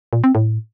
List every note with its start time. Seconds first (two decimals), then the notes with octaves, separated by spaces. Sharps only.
0.13 A#2
0.24 C4
0.35 A2